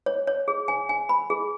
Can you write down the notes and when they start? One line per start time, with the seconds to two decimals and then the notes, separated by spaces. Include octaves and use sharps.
0.06 C#5
0.27 C#5
0.48 G#4
0.68 G#5
0.89 G#5
1.09 B5
1.30 G#4